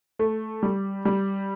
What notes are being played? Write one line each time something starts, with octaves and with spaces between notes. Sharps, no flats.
A3
G3
G3